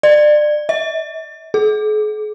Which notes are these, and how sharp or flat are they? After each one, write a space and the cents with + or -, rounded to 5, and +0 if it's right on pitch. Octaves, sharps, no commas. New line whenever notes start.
D5 +25
E5 -40
G#4 +40